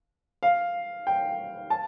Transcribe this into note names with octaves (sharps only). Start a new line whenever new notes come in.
F5
G5
A5